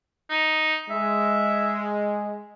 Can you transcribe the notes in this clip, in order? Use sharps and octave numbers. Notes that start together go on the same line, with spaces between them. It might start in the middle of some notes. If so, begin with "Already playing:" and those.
D#4
G#3 E5